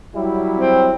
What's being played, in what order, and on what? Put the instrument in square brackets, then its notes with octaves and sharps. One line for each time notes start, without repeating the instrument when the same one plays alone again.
[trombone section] F#3 G3 E4
[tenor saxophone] C4